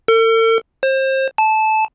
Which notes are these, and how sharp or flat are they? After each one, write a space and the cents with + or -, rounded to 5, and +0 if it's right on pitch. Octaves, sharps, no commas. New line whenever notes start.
A4 +45
C5 +30
A5 -15